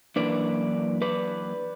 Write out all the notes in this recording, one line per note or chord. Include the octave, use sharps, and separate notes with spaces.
F#2 E3 A#3 D4 B4 D5
B4 D5